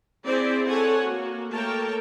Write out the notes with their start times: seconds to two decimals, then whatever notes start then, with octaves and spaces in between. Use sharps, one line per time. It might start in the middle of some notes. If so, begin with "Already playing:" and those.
0.25 C4 E4 G#4 C5 D5
0.67 A4 C#5 F#5 G#5
1.03 A#3 F#4
1.52 A3 A#3 A#4 C#5 G5 A5